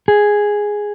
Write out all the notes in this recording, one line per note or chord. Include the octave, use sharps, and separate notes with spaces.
G#4